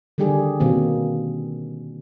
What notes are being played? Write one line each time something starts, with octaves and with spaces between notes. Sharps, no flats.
D3 D#3 G3 D4 G4 G#4
B2 D#3 A#3 C4